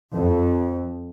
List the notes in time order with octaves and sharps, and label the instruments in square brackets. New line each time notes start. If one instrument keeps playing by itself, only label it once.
[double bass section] F2